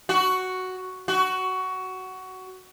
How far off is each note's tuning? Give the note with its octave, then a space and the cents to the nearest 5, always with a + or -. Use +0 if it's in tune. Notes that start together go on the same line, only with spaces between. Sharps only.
F#4 +5
F#4 +15